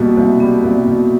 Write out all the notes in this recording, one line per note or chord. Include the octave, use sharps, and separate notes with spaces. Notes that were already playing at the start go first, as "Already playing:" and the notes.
Already playing: C2 B2 G3 A#3
C2
G3 B3
C2
B2